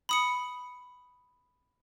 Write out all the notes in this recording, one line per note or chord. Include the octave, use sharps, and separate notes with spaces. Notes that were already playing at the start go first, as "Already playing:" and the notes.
B5 D#6 C#7